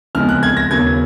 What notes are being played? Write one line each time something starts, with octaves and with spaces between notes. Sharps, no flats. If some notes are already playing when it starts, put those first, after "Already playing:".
F2 C#3 G#3 B3 F6
F#6
G#6
A#6
D#2 C#3 F#3 B3 G#6